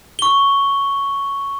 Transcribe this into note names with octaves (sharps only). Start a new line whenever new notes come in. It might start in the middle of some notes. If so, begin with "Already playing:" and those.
C#6 G7